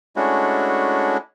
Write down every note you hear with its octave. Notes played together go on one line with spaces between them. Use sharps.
G#3 A3 C#4 D4 E4 F#4